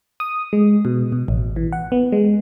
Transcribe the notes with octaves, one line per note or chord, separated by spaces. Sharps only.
D#6
G#3
B2
B2
A1
E3
F#5
B3
G#3